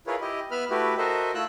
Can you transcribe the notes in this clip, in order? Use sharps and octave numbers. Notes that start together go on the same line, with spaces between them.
E4 F4 G#4 A#4 B4 C#5
E4 G4 D#5
B3 B4 E5 B5 F6
A3 E4 F#4 G4 B4
F#4 A4 A#4 C5 D#5 E5
A3 E4 F4 E6 F#6